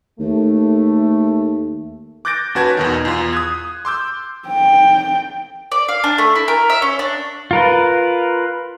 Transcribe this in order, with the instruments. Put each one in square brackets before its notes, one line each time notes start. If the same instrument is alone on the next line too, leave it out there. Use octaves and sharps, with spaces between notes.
[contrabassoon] D#2 [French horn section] A3
[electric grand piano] D6 F#6 G6 A6 A#6 D7
D#2 C#4 F#4 B4 A5 G#6
E2 B2 D#3
E2 F4
D#6 F#6 G#6
C6 D6 E6 G6
[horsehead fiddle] G5
[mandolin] D5
F5
D4
A3
E4
A#4
E5
C#4
D4
[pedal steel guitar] F4 A#4 B4